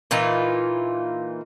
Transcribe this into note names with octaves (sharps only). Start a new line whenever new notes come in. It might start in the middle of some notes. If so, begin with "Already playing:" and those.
A#2 E3 D#4 F4